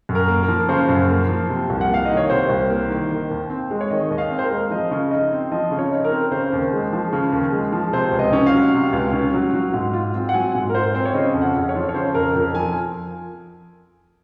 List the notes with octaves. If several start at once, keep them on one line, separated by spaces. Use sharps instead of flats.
F#2
A#4
A#3
A#4
F3
C#3 C5
F#2
A#3
F3
C3
C2
F#5
A#3 F5
D#3 D#5
C#5
C3 C5
C2
A#3
D#3
D#3
D#2
C4
G#3
C#5
D#3 D#5
D#2 D#5
F5
C4
C5
A#4
G#3
F3 D#5
C#3
D#4 D#5
C4
F3 D#5
C#3
C#5
D#4
A#4
C4
C#3 C5
D#2
G#3
F3
C#3
D#2
G#3
F3
C3 C5
C#2
D#5
C#4
F5
F#3
C3
C#2
C#4
F#3
F#3
G#2
F4
C4
F#5
F#3 G#5
G#2
A#4
F4 C5
C4 C5
C#5
C#3 D#5
F2
F#5
F2
C#5
F3
C#5
C#3 C5
F2 A#4
F2 A#4
F3 G#5